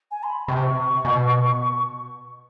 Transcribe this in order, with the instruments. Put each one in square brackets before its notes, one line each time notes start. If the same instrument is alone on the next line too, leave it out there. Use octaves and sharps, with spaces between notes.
[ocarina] G#5
C6
B5
[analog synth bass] C3 [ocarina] C#6
[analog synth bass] B2